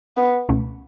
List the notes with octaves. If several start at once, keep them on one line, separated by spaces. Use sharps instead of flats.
B3
C#2 B2 A3 C#4